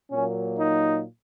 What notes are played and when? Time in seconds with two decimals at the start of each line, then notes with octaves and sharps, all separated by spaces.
0.11 A#2 F#3 A#3 C#4
0.58 D#4